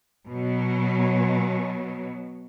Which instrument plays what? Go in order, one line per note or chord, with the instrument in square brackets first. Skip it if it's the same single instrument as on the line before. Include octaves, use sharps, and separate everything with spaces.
[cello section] B2 F#3